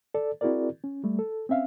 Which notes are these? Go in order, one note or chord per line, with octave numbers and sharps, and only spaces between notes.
A4 D5
C4 E4 F#4 G#4 A#4 D5
C#4
G3 A3
A4
C4 C#4 E5 F5